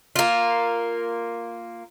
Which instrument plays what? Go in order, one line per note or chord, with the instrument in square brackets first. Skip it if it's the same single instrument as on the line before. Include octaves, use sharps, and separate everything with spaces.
[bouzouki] A#3 F4